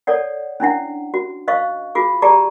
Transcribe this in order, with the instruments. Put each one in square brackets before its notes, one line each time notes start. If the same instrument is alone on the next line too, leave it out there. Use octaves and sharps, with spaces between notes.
[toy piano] A4 C#5 D5 F#5
C#4 D4 E4 F#5
F#4
C5 D#5 F5 C#6
F4 F#4 G#4 D6
G4 G#4 D5 A5 A#5 D6